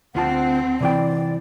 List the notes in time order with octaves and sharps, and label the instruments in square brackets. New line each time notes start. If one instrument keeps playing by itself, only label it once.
[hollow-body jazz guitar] D2 F4 A5 [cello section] C4 [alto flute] F#5
[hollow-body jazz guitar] C3 E3 G5 [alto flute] D5